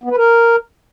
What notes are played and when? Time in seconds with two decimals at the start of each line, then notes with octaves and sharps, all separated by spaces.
0.04 B3
0.10 B4
0.17 A#4